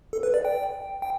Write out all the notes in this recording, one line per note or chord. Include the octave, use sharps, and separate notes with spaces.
A4
B4
D5
G5
G5